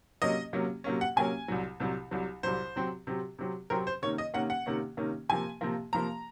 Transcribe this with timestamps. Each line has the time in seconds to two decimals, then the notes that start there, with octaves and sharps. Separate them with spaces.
0.22 C3 F#3 A#3 C#4 D#5
0.53 C3 F#3 A#3 C#4
0.84 C3 F#3 A#3 C#4
1.01 F#5
1.16 C3 F#3 A#3 C#4 G#5
1.48 C2 C3 F#3
1.80 C2 C3 F#3
2.11 C2 C3 F#3
2.43 C2 C3 F#3 C5
2.76 C3 F#3 C4
3.07 C3 F#3 C4
3.39 C3 F#3 C4
3.70 C3 F#3 C4 A#4
3.87 C5
4.02 C3 D#3 A#3 C#4 C#5
4.18 D#5
4.34 C3 D#3 A#3 C#4 F#5
4.50 F#5
4.66 C3 D#3 A#3 C#4
4.97 C3 D#3 A#3 C#4
5.29 C3 F3 A#3 G#5
5.61 C3 F3 A#3
5.93 C3 F3 A#3 A#5